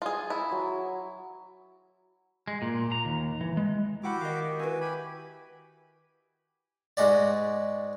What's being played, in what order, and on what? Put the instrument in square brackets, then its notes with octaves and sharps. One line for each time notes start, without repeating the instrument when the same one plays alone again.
[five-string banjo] F4 G#4
E4
[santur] F#3
[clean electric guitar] G#3
A#2
A#5
D#2
E3
G#3
[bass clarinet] E4 [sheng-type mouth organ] F#4 G4 D6 [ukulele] F5 F#5 B5
[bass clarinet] D#3 [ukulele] D#5 F5
[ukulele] E4 B4 [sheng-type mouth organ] F#4 G#5
[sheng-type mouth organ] G4 G#5 B5
[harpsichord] G#2 G#3 F#4 D5